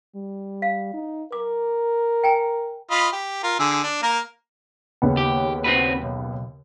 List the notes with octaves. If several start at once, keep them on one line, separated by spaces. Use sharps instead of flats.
G3
F5
D#4
A#4 D6
G5 G#5 A#5
F4 D#5 B5
G4
F4 A#4
D3 G#4 E6
D4
A#3 A#4
D#2 C#3 B3
G4
C4 F#4 B4
B1